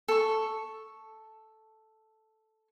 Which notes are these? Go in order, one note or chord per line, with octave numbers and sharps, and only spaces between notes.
A4 C#6